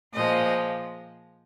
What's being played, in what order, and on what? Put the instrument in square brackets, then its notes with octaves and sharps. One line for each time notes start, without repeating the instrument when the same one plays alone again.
[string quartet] A#2 F3 G#3 D#5